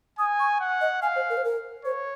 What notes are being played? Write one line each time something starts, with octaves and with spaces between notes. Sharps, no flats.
G#5 D#6
C#6
F#5
D#5
F5 G#5
C5
A#4
C5
A#4
C5 C#5